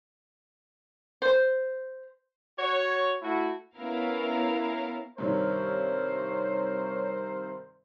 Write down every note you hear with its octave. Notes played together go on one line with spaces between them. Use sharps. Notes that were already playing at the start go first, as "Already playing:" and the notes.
C5
F#4 C#5
A3 E4 F#4
B3 C#4 E4 A#4 F5
G2 C3 D#3 A#4 C5 C#5